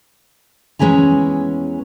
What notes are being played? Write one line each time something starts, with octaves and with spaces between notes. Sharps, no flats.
E2 G#3 C#4 B4 G#5 A#5